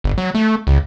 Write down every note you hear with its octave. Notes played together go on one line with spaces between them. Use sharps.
G1
F#3
A3
C#2